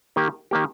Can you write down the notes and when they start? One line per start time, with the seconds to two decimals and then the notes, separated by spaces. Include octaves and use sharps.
0.16 D#3 A#3 G4
0.51 D#3 A#3 G4